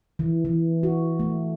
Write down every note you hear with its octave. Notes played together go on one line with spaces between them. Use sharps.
E3
E3
F#4
A3